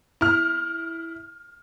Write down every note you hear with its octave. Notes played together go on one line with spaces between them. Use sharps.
E4 F6